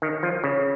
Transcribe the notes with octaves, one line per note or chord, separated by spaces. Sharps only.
D#3
F3
C#3